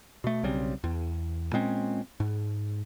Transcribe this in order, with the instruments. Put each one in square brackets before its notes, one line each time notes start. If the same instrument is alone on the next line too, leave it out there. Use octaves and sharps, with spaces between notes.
[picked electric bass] B2 A3
B1 C#3 G3 C4
E2
A#2 G#3 C4 C#4
G#2